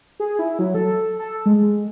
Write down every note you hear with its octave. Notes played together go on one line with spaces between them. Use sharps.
G#4
E4
F#3
A4
A4
G#3